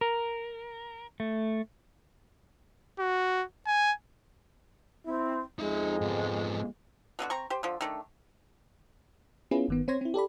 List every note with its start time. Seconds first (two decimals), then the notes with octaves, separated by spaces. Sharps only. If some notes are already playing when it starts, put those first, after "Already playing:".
0.01 A#4
1.20 A3
2.99 F#4
3.66 G#5
5.06 C4 E4
5.59 F2 G#3 D#4 E5
6.01 G#2 B3
7.19 B2 D3 D#3 F#4
7.30 C4 A#5 C#6
7.50 G4 C5
7.63 D3 F3
7.81 D#3 A3 D4
9.51 B3 C#4 E4 F4 G#4 B4
9.68 G1 D#3 B3
9.88 C4 C5 C#5 C6 G#6 A#6
10.01 C4 E4
10.14 G4 A4 D5 B5